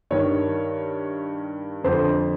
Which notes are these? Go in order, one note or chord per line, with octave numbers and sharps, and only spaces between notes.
G2 D#3 C#5
F2 D3 C5